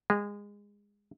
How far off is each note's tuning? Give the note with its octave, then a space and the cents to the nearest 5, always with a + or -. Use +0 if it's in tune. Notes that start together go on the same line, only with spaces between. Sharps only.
G#3 -25